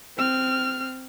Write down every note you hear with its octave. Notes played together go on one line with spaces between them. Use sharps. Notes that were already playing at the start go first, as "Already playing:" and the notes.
C4 F6